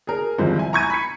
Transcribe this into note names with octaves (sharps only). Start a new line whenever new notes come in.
G#4 A#4
G#1 C#2 F3 G3
E4 G#5
A#5 C#6 G#6 D#7
B5 B6 C#7